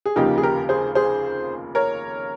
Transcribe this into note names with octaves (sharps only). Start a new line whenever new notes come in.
G#4
F1 D#2 C#3 F3 A#3 D#4 G4
G#4
G4 A#4
G#4 C5
G#4 C5
A#4 C#5